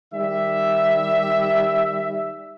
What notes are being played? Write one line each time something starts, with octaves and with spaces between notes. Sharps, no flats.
D#3 G3 E5